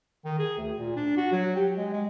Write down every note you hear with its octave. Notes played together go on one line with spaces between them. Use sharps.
D#3
G#4
D2
A#2
D4
F#4
F#3
G4
G#3
G#3